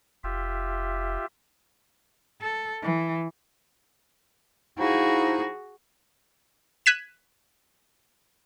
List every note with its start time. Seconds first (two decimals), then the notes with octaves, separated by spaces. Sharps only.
0.24 F1 F4 G4 E5
2.41 A4
2.82 E3
4.78 F3 D#4 E4 F#4 G#4
6.86 F#6 G#6 B6 D#7 E7